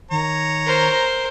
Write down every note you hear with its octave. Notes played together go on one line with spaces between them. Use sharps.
D#3 C#5 A#5
A#4 C5